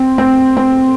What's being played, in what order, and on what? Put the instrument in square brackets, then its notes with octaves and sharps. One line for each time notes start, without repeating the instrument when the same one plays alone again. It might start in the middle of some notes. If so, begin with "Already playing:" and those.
Already playing: [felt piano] C4
C4
C4